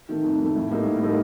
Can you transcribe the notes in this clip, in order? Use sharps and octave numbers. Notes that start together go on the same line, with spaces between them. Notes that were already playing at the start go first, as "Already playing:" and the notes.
D#3 A3
F2
D#3 A3
A2
G3 A#3 D#4 A4
A2
G3 A#3 D#4 A4